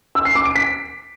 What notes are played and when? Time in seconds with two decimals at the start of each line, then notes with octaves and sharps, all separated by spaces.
0.15 E6
0.25 C7
0.35 D6
0.45 D7
0.56 B6